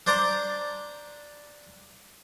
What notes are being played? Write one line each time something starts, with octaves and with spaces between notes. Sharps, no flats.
D4 C5 D5 A#5